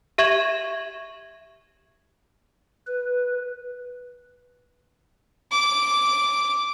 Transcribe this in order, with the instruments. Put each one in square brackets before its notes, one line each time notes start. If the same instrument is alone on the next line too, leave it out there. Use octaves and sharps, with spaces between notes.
[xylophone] G4 E5 C#6 G#6 E7 F#7
[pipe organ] B4
[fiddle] D6